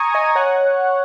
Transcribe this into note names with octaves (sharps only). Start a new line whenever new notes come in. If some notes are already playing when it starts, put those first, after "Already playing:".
Already playing: G#5 A#5 C#6 D#6
D#5 G#5
C#5 F#5